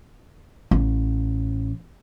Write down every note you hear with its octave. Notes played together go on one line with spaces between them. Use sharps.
A1